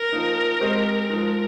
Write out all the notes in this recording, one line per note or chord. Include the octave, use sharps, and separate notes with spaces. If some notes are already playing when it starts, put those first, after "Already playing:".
Already playing: A#4
F3 A#3 D#4
G#3 C4 G4 C5 D#5
F3 G#3 D#4